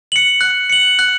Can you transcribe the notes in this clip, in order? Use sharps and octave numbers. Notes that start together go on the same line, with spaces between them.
C#7 F#7
F#6
C#7 F#7
F#6